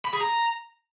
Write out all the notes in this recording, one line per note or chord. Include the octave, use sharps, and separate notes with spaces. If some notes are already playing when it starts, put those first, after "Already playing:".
B5
G#4
A#5